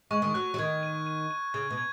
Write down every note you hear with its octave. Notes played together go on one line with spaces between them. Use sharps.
G#3 C#6
D#3
F#3 F#6
F#3
D#3 G#6
D#7
D#7
D#7
C#3 G#6
B2
G#6